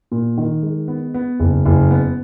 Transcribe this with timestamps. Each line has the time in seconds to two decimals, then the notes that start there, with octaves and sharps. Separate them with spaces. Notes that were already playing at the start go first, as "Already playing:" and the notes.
0.11 A#2
0.38 D#3
0.63 G#3
0.88 B3
1.14 B3
1.40 F#1
1.66 F#1
1.91 B3